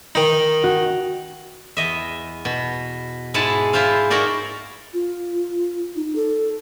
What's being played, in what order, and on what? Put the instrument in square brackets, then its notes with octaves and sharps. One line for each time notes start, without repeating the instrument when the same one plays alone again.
[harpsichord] D#3 D#4
[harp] F#4
[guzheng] E2 D#5 E5
B2
G#2 G#3 E4 F#5 A5
E4 F4 C5 F5
D#4 E4 F#4 A#4 D5
[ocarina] F4
D#4
A4